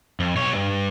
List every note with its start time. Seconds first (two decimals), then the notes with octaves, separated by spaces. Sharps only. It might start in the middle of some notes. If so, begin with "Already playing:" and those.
0.20 F2
0.37 B1 C#5
0.54 G2